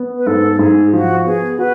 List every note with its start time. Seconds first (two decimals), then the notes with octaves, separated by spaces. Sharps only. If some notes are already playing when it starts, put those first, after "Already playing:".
Already playing: B3
0.18 B4
0.26 G#2 A4
0.53 A4
0.59 G#2 G#4
0.93 F3 F#4
1.25 B3 G#4
1.59 F#4 B4